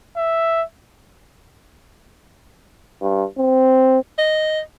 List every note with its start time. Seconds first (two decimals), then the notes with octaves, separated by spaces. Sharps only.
0.16 E5
3.02 G2
3.38 C4
4.18 D#5